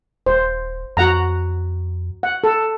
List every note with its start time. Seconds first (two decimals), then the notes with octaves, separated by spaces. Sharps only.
0.26 D#1 C5
0.97 F2 F#4 F#5 A#5
2.23 F#5
2.44 A4